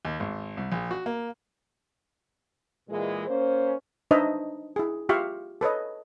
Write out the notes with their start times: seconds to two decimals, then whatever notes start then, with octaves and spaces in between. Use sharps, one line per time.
0.05 D#2
0.20 G#1
0.57 C2
0.72 A#1
0.91 F#4
1.06 A#3
2.89 A#2 E3 G#3 G#4
3.28 A#3 C#4 C5
4.11 D4 D#4 B4 C5 D#5 E5
4.76 E4 G#4
5.09 F4 G4 E5 F5 C#6
5.61 A4 B4 C#5 D#5